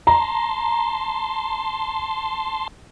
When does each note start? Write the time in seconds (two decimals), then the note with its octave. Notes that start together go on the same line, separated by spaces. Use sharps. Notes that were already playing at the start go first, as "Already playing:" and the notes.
0.07 A5 A#5 C6